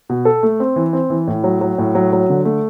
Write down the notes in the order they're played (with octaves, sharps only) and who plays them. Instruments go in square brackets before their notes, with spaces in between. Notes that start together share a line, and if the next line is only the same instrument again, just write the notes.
[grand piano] B2
A4
A3
C4
E3
C4
E3
A2
F#3
F#3
A2
F#3
F#3
D3
A3